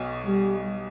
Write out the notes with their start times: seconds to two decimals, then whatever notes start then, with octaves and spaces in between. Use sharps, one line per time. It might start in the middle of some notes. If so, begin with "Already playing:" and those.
Already playing: B1 B2
0.26 G3